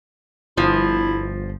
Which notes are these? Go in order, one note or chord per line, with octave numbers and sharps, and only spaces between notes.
G1 F3 E4